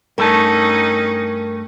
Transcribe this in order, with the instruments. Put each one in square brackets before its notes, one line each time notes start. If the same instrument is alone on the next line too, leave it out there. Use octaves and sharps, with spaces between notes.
[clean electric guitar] G2 A3 A5 [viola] C#4 D#4 [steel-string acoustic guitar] A#4